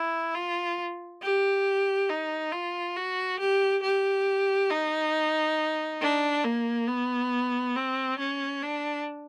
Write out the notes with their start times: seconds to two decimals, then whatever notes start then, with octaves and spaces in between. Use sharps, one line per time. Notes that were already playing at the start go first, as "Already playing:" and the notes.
Already playing: E4
0.35 F4
1.22 G4
2.09 D#4
2.52 F4
2.96 F#4
3.40 G4
3.83 G4
4.71 D#4
6.01 D4
6.45 A#3
6.88 B3
7.76 C4
8.19 C#4
8.63 D4